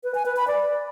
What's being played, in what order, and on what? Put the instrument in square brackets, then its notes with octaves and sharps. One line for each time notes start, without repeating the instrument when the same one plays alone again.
[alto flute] B4
G#5
B4
B5
D5